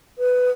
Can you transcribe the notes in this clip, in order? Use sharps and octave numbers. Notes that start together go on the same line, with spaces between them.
B4